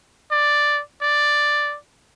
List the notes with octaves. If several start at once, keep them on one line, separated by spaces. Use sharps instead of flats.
D5
D5